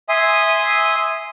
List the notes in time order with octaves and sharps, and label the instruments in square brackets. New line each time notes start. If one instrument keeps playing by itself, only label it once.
[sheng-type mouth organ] E5 G#5 C6 D#6